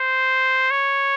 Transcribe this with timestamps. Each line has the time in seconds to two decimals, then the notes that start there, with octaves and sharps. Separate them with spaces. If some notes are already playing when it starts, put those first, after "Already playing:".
Already playing: C5
0.71 C#5